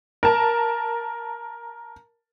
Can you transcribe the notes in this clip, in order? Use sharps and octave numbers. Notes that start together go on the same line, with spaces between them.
A#4 A5